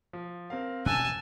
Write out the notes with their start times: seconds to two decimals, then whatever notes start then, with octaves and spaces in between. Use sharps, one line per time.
0.13 F3
0.50 C4 A#4 F5
0.86 E2 B2 C#4 G#5 A5 E6 F#6